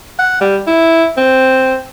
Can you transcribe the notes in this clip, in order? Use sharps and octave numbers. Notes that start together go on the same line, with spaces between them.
F#5
G3
E4
C4